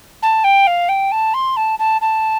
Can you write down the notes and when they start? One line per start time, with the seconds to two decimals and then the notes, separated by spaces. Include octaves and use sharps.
0.22 A5
0.44 G5
0.67 F5
0.89 G5
1.11 A5
1.34 C6
1.56 A5
1.79 A5
2.01 A5